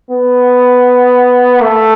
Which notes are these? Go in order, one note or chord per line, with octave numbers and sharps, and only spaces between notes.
B3
A3